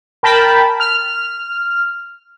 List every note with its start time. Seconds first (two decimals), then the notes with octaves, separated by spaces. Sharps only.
0.23 A#4 G5 A5 B5
0.80 F6